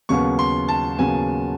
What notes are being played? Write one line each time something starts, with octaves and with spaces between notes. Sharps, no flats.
D#2 C#3 F#3 B3 C#6
C6
A5
D#2 C#3 F#3 B3 G#5